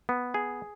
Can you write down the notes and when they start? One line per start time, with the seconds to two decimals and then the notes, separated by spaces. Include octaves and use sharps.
0.09 B3
0.34 G#4